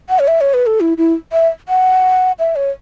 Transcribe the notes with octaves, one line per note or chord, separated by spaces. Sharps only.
F#5
C#5
E5
C#5
B4
A4
E4
E4
E5
F#5
E5
C#5